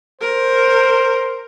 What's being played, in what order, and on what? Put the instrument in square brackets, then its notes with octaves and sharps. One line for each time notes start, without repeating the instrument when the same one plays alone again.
[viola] A#4 [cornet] C5